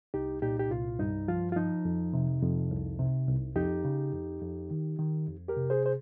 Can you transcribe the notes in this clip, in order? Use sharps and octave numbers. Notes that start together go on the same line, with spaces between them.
C2 D#4 G4
A#2 D#4 G4
G4
C2 F4
G2 D#4
F3 F4
F4
F3 D#4
F2
C3
F2
C2
C3
C2
F2 D#4 G4
C#3
F2
F2
D#3
D#3
F2
G4 A#4
C3
G#4 C5
C5